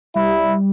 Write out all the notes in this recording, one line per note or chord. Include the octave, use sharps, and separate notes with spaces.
G3 E4